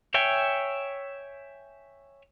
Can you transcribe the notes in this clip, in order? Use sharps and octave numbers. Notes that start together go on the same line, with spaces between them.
C#5 E5 G5 G#5